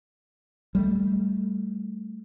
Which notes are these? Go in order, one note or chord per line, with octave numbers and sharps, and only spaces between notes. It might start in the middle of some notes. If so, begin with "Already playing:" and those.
G3 A3